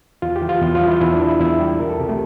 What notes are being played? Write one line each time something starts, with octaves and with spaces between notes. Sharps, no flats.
E2 F4
G4
E3
F4
E2 E4
F4
G3
E4
E2 E4
D4
E3
E4
E2 E4
G3 G4
C2 A#4
A4
C3 G4
A3